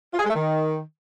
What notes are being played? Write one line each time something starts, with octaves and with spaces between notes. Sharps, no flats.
F4
G#4
G#3
A3
D#3